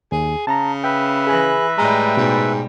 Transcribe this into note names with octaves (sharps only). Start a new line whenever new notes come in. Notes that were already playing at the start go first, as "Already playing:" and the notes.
D#2 G#4
C#3 A5 A#5
B4 E5 G5
E3 G#4 G#5 F#6 A#6
A2 G3 G#3 G5 A#5
G#2 B2